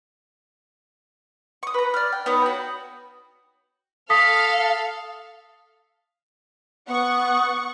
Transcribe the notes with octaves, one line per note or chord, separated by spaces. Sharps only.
C#6 D#6
B4 A#5
D5 F6
G5
B3 D#4 C#5 D#6
F#4 G5
A4 F5 D#6 B6
B3 F#5 C#6